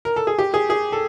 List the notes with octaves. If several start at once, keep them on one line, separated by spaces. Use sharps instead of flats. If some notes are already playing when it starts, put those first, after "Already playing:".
A#4
A4
G#4
G4
G#4
G#4
A4